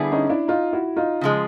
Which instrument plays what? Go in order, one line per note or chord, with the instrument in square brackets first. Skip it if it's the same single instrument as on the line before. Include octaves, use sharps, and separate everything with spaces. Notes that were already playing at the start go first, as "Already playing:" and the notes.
Already playing: [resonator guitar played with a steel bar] D3 G3 B3 E4 G#4
[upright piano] C#4 D#4
D4 E4
D#4 F4
E4 F#4
D#4 F4
[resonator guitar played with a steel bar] C#3 F3 G#3